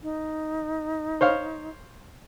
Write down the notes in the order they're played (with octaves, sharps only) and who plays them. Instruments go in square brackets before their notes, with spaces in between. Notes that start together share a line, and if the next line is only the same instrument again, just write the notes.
[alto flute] D#4
[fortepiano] C5 C#5 F5